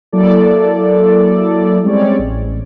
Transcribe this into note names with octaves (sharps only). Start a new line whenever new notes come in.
F#3 A#3 E4 A4 D5
G3 G#3 C4 C#4 C#5 D5
A1